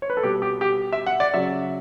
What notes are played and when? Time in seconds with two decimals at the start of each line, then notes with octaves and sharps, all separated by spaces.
0.02 C#5
0.10 B4
0.17 A4
0.23 B2 G3 G4
0.42 G4
0.61 G4
0.93 E5
1.06 F#5
1.20 D5
1.34 C#3 F#3 E5